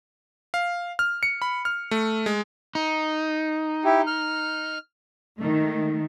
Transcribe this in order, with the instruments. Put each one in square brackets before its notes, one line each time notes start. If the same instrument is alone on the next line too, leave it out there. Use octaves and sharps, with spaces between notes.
[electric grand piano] F5
F6
C#7
B5
F6
A3
G#3
[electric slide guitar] D#4
[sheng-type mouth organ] E4 G4
F6
[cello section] D#3 A3